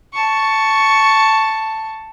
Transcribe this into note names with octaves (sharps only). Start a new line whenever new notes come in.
A5 C#6